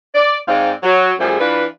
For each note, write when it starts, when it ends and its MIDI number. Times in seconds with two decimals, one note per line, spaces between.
0.15 0.36 74
0.48 0.72 44
0.48 0.72 56
0.48 0.72 60
0.48 0.72 63
0.48 0.72 74
0.48 0.72 77
0.83 1.13 54
1.20 1.38 42
1.20 1.38 53
1.20 1.38 55
1.20 1.38 57
1.20 1.38 68
1.40 1.65 52
1.40 1.65 62
1.40 1.65 65
1.40 1.65 71